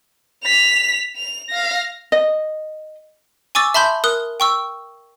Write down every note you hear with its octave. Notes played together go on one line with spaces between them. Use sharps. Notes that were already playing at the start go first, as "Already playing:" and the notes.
B6 F7
F7
F5 A#6
D#5
G#5 C#6 D6 E6 A6
E5 A5 B5 C6 G6
A#4 D#6 F#6
G5 C#6 E6